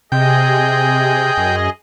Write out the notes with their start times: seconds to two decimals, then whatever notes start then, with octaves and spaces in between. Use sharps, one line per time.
0.12 C3 G#4 D#5 G5
1.38 F#2